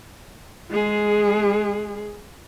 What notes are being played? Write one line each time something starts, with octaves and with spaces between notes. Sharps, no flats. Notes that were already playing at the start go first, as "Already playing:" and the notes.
G#3 G#4